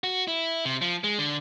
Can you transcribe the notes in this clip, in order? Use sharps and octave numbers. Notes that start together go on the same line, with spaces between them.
F#4
E4
C3
F3
G#3
D3